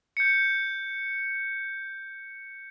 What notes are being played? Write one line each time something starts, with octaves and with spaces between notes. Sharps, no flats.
G6 C#7